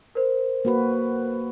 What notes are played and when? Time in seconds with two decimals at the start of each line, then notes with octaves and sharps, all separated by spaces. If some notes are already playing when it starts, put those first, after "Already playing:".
0.15 A#4 C5
0.65 A#3 F#4 B4